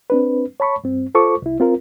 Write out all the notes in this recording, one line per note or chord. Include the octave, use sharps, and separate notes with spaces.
C4 D4 B4
C#5 A5 B5 C#6
G2 C4
F4 A4 C5 C#6 D6
C2 E4
C4 F4 A#4